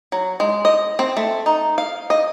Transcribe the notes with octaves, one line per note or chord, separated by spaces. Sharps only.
F#3
G#3
D#5
C4
A3
D#4
F5
D#5